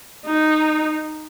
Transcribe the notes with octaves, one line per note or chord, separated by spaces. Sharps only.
D#4